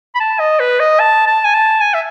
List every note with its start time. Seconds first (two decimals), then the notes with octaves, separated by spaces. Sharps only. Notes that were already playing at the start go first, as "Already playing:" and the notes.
0.15 B5
0.20 A5
0.40 D#5
0.60 B4
0.80 D#5
1.00 A5
1.27 A5
1.45 G#5
1.54 A5
1.81 G#5
1.94 E5